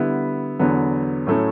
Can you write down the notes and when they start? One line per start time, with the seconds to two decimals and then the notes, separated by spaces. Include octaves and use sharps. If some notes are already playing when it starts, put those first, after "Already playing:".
Already playing: D3 G3 B3 E4
0.59 E2 D3 F#3 B3
1.27 A2 F#3 A3 C#4